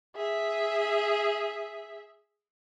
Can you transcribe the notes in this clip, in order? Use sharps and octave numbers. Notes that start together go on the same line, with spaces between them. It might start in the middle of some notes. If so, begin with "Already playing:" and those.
G#4 E5